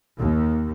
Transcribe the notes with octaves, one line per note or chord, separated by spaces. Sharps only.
D#2